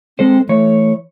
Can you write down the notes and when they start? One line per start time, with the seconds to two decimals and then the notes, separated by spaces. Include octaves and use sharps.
0.19 G#3 C4 A4 C5
0.49 E3 A3 C#5